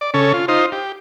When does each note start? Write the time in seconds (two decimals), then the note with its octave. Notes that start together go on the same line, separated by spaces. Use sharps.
0.01 D5
0.14 C#3 C#4 A4
0.33 F4
0.48 D#4 F4 C5
0.72 G4